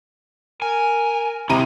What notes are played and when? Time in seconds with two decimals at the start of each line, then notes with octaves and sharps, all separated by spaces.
0.62 A#4 G#5
1.49 C3 G#3 E4 G4 A#5 D#7